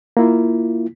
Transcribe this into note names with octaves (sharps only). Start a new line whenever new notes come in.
A#3 E4 F4